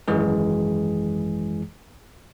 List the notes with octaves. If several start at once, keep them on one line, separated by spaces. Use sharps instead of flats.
G#1 F#2 E3 G#3 G#4